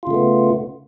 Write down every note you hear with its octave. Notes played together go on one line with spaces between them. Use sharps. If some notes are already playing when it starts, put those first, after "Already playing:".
C#3 A3 B3 F4